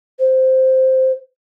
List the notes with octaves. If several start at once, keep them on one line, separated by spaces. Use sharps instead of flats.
C5